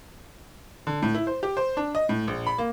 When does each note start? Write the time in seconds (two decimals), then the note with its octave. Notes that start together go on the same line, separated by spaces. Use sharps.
0.87 D3
1.02 A2
1.15 E4
1.27 C5
1.43 G4
1.57 C5
1.77 D4
1.95 D#5
2.09 A2
2.28 A#1
2.47 B5
2.58 A#3